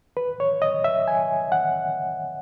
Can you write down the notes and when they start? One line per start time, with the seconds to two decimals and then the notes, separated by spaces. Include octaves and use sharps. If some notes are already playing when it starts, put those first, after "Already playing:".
0.17 B4
0.40 C#5
0.62 D#5
0.84 E5
1.08 G#5
1.52 F#5